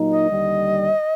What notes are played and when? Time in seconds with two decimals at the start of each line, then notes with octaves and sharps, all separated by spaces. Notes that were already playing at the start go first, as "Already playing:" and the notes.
Already playing: A#2 F#3 A#3 D#4
0.11 D#5
0.30 D#2 D3 G3